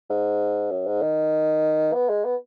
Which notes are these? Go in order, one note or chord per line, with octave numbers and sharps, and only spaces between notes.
G#2
F#2
G#2
D#3
B3
G#3
B3